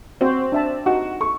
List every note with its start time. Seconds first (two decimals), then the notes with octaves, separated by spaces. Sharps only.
0.21 C4 F#4 C5
0.52 D4 E5 A5
0.86 D#4 F#4
1.21 A4 C#6